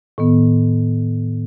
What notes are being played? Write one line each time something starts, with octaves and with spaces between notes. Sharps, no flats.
A2 D#3 B3